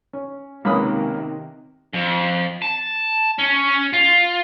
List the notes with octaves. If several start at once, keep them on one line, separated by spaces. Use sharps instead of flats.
C#4
C#2 C3 D#3 A#3 C#4 B4 B5 D#6
F2
A5
C#4
F4